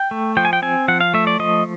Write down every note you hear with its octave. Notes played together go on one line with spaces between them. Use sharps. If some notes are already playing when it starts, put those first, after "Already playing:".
Already playing: G5
A3
F3 G5
G#5
G5
C4 G#5
F3 F#5
F5
A3 E5
D5
F3 D#5